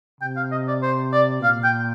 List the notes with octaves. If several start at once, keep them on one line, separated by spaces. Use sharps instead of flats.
C3 G5
F5
D#5
D5
C5
D5
A#2 F5
G5